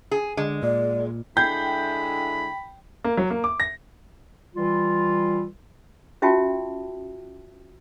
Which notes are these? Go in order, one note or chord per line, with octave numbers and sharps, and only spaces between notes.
G#4
D3 G#3
A#2 D5
D3 G#3 E4 G5 B5 G6
A#3
F#3
A#3
D6
A#6
E3 G3 F4
C#4 F4 F#4 E5 G5 A5